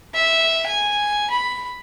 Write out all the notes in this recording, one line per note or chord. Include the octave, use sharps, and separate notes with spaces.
E5
G#5
B5